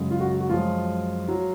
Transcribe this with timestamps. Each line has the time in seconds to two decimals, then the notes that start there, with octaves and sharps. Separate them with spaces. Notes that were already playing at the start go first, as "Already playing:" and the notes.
Already playing: F#2 C#3 G#3
0.11 F4
0.20 F#4
0.40 F#4
0.49 F#2 F3 G#3 F4
1.28 F#3